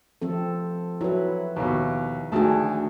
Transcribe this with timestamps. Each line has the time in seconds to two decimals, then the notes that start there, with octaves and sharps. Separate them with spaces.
0.22 F3 C4 A4
1.01 F#3 E4 B4
1.56 D#2 B2
2.32 D2 D#3 A3 F#4 G#4 A5